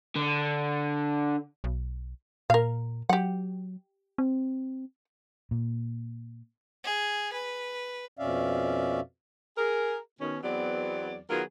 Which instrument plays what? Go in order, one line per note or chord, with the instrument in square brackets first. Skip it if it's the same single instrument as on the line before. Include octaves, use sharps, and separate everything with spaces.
[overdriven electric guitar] D3
[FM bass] B1
[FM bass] A#2 [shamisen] A#4 F5
[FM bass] F#3 [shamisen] G4 F#5
[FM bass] C4
[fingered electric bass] A#2
[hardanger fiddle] G#4
B4
[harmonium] F2 B2 C#4 D5 E5 F5
[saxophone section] G#4 A#4
B2 D#3 C#4
E2 F#3 B3 C4 D5
D#3 F#3 B3 F4 G#4 A#4